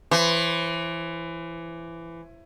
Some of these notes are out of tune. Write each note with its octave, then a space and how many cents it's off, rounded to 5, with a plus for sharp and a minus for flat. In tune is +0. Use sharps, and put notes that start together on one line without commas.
E3 +20 C5 +35